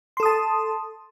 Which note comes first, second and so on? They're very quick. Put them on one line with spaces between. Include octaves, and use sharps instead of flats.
C6 A4 D#6 A5